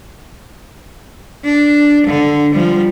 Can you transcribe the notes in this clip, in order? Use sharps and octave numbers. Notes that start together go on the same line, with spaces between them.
D4
D3
F3 G3